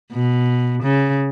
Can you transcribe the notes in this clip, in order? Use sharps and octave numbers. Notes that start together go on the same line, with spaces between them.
B2
C#3